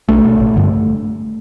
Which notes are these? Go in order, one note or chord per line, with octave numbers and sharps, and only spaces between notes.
B1 A3 D4
B2
A1
G2 D3